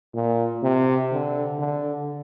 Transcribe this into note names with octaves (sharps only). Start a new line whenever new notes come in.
A#2
C3
D3
D3